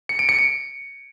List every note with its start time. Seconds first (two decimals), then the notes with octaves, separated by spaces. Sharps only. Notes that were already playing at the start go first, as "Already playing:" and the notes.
0.09 C#7
0.19 D7
0.29 C#7
0.38 D7